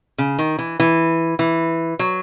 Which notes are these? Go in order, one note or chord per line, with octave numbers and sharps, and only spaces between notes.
C#3
D#3
E3
E3
E3
F#3